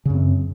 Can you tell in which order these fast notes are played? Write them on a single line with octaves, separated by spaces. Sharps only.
C#3 F#2 C4